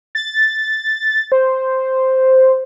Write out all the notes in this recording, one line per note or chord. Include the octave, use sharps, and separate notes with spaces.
A6
C5